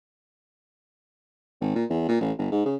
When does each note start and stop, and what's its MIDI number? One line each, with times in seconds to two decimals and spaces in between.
1.61 1.71 32
1.75 1.84 46
1.90 2.05 40
2.08 2.16 46
2.21 2.31 33
2.38 2.49 31
2.52 2.63 44
2.65 2.76 49